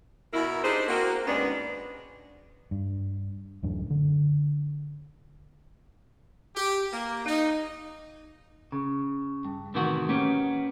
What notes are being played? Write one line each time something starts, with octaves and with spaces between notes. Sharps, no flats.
B2 E4 A#4
D4 D#4 G4 G#4 C5
A#3 C4 F#4
D#2 G#2 G#3 B3 C#4 D4
G2
D1 A1 F#2 D4
D3
G4
A#3
D#4
C#3
G2
A2 C3 D#3 E3 B3 F#4
A#3 B3 C#4 G4